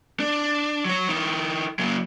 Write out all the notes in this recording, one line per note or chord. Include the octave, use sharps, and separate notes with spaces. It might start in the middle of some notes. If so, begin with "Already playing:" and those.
D4
F#3 C#5
E3 D#4
F#3 A#3